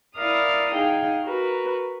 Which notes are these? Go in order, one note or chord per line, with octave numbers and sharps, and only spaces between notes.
E4 A#4 D5 F5 D#6 F6
D#4 G#4 F5 G5
F#4 A#4 B4